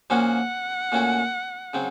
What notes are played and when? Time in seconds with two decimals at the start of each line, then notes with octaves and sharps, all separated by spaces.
0.10 A#2 F3 A#3 C#4 F#4 F#5
0.92 A#2 A3 C#4 F#4
1.74 C#3 F#3 C4